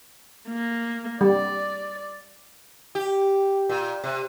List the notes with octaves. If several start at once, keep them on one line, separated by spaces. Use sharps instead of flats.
A#3
G3 D5
G4
A#2
C3